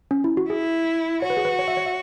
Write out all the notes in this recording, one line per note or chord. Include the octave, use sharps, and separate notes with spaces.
C#4
E4
F#4
E4 G#4
F#4 C#5
B4
G#4
B4
C#5
E5
C#5
E5